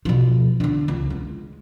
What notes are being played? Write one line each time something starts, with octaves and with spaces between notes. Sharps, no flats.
B2 F3
D3 D4
C#2
G#3